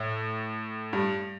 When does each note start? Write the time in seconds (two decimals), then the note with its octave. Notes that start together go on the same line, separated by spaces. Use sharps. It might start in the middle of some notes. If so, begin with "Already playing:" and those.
Already playing: A2
0.93 G2